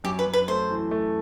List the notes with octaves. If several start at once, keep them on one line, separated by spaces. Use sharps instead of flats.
F#2 G4
B4
F#2
B4
A3 C5
E3
A3